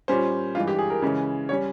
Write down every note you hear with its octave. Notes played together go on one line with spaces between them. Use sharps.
A#2 G3 C#4 C5
G2 E3 G#3 F4
G4
G#4
A#4
C#3 E3 G#3 C#4
G3 C#4 C#5